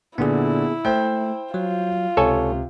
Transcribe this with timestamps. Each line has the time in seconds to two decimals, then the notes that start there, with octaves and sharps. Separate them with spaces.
0.18 A#2 D3 B3 E4 G#4
0.85 A3 C5 G5
1.54 F#3 F4
2.17 C#2 C3 A4 C#5 G#5